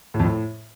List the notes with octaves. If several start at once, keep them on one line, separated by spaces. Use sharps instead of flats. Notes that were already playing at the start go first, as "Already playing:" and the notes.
A2
F2
A2